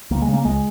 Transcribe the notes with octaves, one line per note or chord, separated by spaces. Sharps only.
C#2 A#3
G#3
C#3
A#3
C#2 G#3